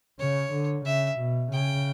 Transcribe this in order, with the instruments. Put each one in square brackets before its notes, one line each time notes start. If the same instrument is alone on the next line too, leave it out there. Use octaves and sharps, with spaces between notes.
[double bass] C#3 [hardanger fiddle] C#5
[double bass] D3
[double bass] C#3 [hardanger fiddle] E5
[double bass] B2
[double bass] C#3 [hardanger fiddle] G5